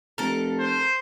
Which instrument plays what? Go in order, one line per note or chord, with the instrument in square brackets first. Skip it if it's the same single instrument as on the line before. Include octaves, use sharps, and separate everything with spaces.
[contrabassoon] F1 [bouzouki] A4 A#4
[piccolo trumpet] C5